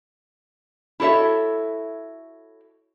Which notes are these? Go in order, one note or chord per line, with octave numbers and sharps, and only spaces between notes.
E4 F#4 A4 C#5 E5